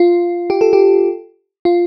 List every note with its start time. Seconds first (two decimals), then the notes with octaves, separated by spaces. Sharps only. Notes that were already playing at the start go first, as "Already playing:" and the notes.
Already playing: F4
0.50 G4
0.61 A4
0.73 G4
1.65 F4